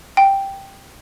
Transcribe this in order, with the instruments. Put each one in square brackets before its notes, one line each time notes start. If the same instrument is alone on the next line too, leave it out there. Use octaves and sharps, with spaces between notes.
[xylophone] G5